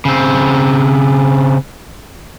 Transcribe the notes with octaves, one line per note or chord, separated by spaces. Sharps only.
C#3 C4